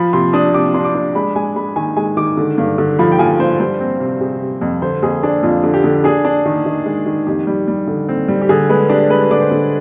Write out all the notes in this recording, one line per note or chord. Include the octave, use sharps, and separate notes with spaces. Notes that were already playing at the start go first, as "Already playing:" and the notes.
Already playing: F3 B5
C3 C6
D4 D#6
C3 D6
D4 C6
D6
D4
G#3 B5
G#3 G#5
G#3 B5
D#3 G#5
G#3 G#5
D#3 D6
D3
G2
D3
F3 B5
G5
F3 G#5
G2 C5
G3 C5
C4
C3
C3 G#4
C3
F2
D3 C5
F2 G#4
D4 G#4
F2 F4
D3
G4
D3
D4 G#4
D4
D#3
D#3
G#3
D#3
F2 G4
G3
G3
D3
C4
G3
G4
D3 G#4
G#3 B4
D4 G4
G#3 B4
D3 D5
C5
D3